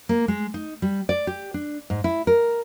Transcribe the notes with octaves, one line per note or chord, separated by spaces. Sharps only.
A#3
G#3
D#4
G3
D5
G4
D4
G#2
E4
A#4